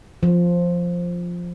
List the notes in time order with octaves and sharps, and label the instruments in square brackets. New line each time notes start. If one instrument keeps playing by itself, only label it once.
[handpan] F3